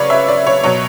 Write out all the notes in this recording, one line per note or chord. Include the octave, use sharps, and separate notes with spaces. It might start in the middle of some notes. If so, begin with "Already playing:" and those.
Already playing: C#3 F#3 B4 C#5 D5
E5
D5
C#5
B2 F#3 C#5